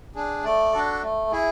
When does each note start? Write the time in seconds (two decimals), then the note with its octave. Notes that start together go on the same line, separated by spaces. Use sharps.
0.15 D4 G#4
0.44 A3 D5
0.73 D4 F#4 A4
1.03 A3
1.32 E4 G#4